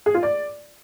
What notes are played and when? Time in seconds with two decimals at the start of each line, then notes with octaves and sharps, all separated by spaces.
0.06 G#4
0.14 F4
0.23 D5